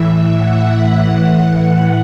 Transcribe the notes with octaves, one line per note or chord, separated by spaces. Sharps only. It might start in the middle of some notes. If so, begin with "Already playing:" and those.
Already playing: A2 E3 E5
F#5
E5
A2 E3 F#5